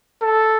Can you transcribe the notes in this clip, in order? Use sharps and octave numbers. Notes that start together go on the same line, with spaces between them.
A4